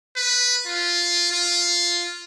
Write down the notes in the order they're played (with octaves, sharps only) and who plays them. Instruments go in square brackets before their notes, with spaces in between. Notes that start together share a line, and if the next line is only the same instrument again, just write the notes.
[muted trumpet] B4
F4
F4